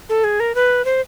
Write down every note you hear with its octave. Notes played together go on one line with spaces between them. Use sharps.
A4
G#4
A#4
B4
C5